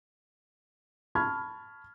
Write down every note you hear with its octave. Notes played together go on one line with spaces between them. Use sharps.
A5 B5 C#6 F6 G#6